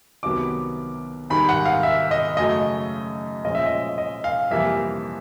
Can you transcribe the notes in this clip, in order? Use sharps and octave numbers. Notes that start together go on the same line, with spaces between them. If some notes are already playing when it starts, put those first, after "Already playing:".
C2 C3 D#3 F#3 B3 D6
G#2 D#3 G3 B5
F#5
F5
E5
D#5
F#2 C#3 F#3 A3 D#5
A#2 F3 G#3 C#4 D#5
E5
D#5
D#5
F5
F2 C3 E3 G3 A#3 E5